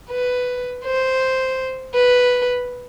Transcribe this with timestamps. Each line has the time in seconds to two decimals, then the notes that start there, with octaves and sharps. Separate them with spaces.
0.10 B4
0.85 C5
1.94 B4